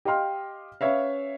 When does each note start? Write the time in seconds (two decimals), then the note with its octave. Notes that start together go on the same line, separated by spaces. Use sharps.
0.05 G4 D#5 F5 G5 C6 F6
0.81 C#4 B4 C#5 E5 F5